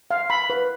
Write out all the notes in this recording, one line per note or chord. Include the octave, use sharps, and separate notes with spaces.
F5
B5
B4